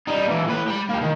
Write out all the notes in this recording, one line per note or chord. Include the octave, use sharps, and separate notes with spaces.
G3 D#4
A#2 E3
A2 B4
G4 B5
A#3 G4
D#3